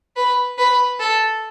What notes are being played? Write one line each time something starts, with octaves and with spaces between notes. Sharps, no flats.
B4
B4
A4